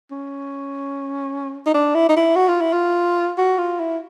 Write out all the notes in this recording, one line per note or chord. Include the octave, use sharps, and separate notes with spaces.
C#4
D#4
D4
E4
D#4
E4
F#4
F4
E4
F4
F#4
F4
E4